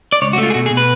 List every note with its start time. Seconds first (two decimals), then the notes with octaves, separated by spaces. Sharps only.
0.12 D5
0.22 C#2 C#5
0.33 F#4
0.38 A3
0.43 F4
0.50 G#4
0.54 B2 F#4
0.66 G#4
0.71 B2
0.77 B4